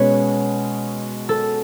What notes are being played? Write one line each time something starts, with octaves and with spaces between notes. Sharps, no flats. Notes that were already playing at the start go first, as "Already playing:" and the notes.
Already playing: B2 G#3 C#4 B4 C#5
A4